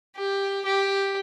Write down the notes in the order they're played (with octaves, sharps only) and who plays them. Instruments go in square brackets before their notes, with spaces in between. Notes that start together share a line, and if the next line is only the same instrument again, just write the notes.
[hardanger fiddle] G4
G4